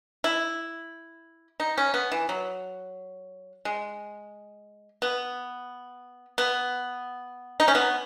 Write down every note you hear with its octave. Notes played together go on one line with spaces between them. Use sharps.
E4
D#4
C#4
B3
E3
F#3
G#3
B3
B3
D#4
C#4
B3